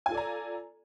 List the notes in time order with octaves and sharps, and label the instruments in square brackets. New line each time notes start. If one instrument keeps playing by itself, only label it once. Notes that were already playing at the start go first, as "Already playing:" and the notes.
[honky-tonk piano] G#5
F4
A4
D5
A#5